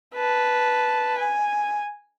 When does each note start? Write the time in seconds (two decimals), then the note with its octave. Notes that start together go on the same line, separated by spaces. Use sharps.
0.15 B4 A5
1.18 G#5